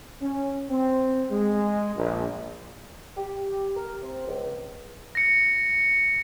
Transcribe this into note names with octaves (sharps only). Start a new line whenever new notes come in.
C#4
C4
G#3
A#1
G4
A#4
C4
C#2
A#6 C#7